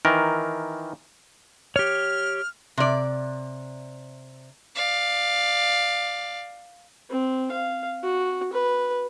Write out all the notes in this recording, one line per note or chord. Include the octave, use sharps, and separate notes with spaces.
D#3 E3 A#4
G4 C#5 F6
C3 D5
D5 F5
C4
F5
F#4
B4